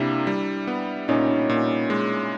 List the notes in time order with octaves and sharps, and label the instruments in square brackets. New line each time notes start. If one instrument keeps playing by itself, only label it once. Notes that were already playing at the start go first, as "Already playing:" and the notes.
Already playing: [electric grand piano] C3 G3 A#3 [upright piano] D4 E4
[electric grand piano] G3
B3
[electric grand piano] A#2 [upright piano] C#4 D#4
[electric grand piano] A#2
G#3